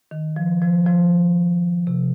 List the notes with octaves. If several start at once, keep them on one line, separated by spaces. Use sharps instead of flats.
D#3
F3
F3
F3
C3